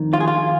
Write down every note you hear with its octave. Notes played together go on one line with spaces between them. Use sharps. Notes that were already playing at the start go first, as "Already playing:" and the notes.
Already playing: F2 D#3
F4
G#4
F4